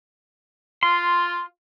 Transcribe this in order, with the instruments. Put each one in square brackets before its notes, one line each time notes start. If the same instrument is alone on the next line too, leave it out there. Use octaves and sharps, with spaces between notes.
[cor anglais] F4 [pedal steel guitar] C6